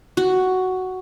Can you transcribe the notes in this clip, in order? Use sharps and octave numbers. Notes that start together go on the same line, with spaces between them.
F#4